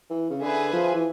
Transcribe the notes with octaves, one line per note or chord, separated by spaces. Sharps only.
E3
C#3
D3 G#4 B4 E5 G#5
F3
E3